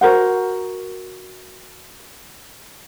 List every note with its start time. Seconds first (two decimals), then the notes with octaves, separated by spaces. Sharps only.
0.01 F#4 A#4 C5 F#5